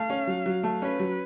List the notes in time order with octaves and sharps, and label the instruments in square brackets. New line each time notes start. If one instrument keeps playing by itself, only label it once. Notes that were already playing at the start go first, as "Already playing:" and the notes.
Already playing: [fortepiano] A3 [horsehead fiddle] F5
[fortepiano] C#4
F#3
F#3
A3
[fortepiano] C#4 [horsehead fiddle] B4
[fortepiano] F#3